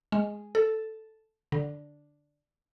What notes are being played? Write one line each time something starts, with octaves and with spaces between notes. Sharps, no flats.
G#3
A4
D3